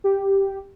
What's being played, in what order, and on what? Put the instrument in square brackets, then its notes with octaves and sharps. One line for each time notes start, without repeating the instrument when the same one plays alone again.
[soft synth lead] G4